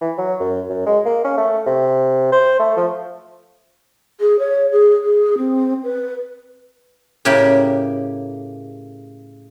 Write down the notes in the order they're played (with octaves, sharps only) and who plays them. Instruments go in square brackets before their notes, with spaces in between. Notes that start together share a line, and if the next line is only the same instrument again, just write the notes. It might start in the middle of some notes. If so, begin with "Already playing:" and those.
[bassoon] E3
F#3
F#2
F#2
G#3
A#3
C#4
A3
C3
C5
A3
F3
[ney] G#4
C#5
G#4
G#4
C4
B4
[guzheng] A2 C#3 A#3 G4